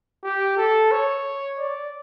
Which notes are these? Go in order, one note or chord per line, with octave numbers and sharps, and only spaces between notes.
G4
A4
C#5
D5